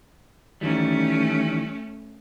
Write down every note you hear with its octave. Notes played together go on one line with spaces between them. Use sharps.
D#3 E3 G3 A3 C#4